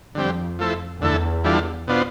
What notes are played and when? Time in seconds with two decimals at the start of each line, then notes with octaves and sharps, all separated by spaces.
0.15 F2 D3 G3 C4 G4
0.59 F3 A3 E4 A4 C5
1.02 E2 D3 A3 E4 A4
1.44 E3 G3 D4 F4 A4
1.87 B2 B3 D4 F4 C5